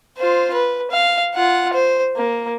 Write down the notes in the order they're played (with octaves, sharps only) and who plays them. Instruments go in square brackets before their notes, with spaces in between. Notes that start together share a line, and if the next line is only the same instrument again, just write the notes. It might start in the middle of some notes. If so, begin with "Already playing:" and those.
[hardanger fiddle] F4 C5
B4
F5
F4 F#5
C5
A#3